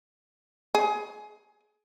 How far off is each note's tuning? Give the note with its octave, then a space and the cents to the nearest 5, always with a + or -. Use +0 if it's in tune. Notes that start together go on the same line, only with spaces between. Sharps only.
G#4 +25